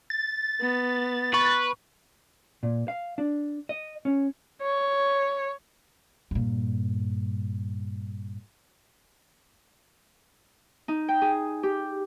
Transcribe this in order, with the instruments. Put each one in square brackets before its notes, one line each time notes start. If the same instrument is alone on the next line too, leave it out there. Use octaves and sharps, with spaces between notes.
[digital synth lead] A6
[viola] B3
[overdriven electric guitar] B4 [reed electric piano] C#6
[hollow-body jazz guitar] A#2
F5
D4
D#5
C#4
[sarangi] C#5
[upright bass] G2 A#2
[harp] D#4
G5
G#4
G4